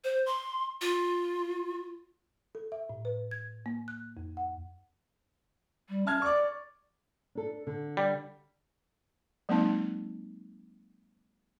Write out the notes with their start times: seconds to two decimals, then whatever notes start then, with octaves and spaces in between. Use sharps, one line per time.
0.04 C5
0.26 C6
0.81 F4
2.55 A4
2.72 E5
2.89 A2
3.05 B4
3.31 G#6
3.66 A#3
3.88 F#6
4.17 F2
4.37 F#5
5.89 G3
6.07 C#4 A5 F6 G#6
6.22 D5 C#6 D6
7.35 D4 A4
7.67 D3
7.97 G3
9.49 F#3 G#3 A#3 C4 D#4 A5